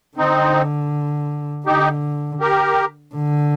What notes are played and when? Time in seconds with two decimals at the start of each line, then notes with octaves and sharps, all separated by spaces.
0.17 D3 C4 D#4
1.66 D3 D#4 G4
2.40 G4 A#4
3.15 D3